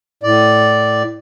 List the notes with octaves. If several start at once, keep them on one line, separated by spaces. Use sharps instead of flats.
A2 D5